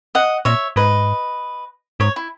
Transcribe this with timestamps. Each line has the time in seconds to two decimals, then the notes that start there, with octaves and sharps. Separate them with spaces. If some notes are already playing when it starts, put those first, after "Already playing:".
0.15 D#5 F#5
0.45 A#2 C#5 E5
0.76 G#2 B4 D#5
2.00 G#2 C#5
2.16 E4